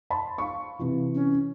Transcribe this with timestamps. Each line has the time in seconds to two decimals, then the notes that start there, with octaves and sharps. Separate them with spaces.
0.10 A5 B5 C6
0.38 F5 C#6
0.79 C3 E3
1.15 C#4